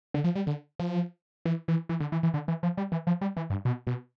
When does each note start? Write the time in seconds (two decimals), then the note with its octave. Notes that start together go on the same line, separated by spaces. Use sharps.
0.14 D3
0.24 F3
0.35 G3
0.47 D3
0.79 F3
1.45 E3
1.68 E3
1.89 E3
2.00 D3
2.12 E3
2.23 E3
2.34 D3
2.48 E3
2.63 F3
2.77 G3
2.92 E3
3.07 F3
3.21 G3
3.37 E3
3.50 G2
3.65 B2
3.87 B2